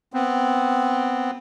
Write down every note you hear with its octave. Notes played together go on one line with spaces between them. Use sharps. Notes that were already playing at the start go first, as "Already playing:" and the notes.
B3 C4